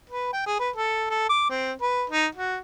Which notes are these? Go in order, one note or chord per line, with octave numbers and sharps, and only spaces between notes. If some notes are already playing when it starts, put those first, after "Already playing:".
B4
G5
G#4
B4
A4
A4
D6
C4
B4
D#4
F#4